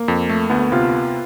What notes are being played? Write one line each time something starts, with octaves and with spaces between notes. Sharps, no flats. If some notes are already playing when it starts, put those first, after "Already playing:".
Already playing: A#3
F2
A3
D2 B3
C3 F4